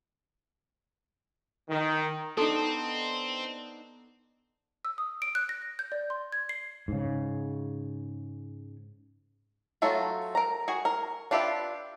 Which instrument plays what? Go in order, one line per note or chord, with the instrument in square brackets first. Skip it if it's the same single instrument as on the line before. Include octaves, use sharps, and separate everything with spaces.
[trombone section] D#3
[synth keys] B3 D4 D#4 [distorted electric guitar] C4 [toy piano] A4 [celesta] A5 C6
[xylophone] E6
D#6
D7
F#6
A#6
F#6
G6
D5
C6
G#6
C7
[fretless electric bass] G#2 C#3
[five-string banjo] F#3 A3 F4 A4
A#4 A#5
F#4 G#4 G#5
A#4
D4 F4 G4 B4 E5